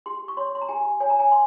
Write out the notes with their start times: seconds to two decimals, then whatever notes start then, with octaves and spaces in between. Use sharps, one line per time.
0.06 G4 C6
0.28 C#6
0.37 C#5 C6
0.55 C6
0.61 A#5
0.69 G4 G#5
1.00 C#5 G#5
1.10 A#5
1.20 G#5
1.32 C6